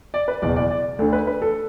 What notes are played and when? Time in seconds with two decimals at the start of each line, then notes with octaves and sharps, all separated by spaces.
0.14 D5
0.28 B4
0.42 F#1 E2 B2 D5
0.56 D5
0.71 D5
0.99 D2 A4
1.02 D3
1.13 B4
1.27 B4
1.42 A4